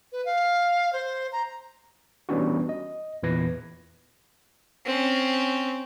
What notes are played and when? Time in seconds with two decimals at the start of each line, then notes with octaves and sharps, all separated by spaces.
0.12 B4
0.25 F5
0.93 C5
1.32 A#5
2.29 E3 G3 B3 C#4 D4 F#4
2.69 D#5
3.23 E2 A#2 E3 B4 G#6 A#6
4.85 C4 C#4